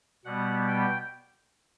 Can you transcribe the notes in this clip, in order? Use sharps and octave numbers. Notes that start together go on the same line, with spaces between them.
B2 G3 B3 F#5
G5